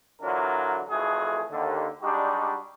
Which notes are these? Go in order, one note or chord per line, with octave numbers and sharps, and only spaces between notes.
D3 E3 F#3 D4 F4 A#4
F2 E3 A3 F#4 G#4
D#2 D3
G3 G#3 D4 D#4 F#4 G4